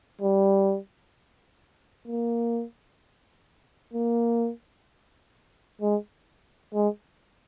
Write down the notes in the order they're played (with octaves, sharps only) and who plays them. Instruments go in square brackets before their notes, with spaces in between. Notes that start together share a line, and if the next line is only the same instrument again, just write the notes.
[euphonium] G3
A#3
A#3
G#3
G#3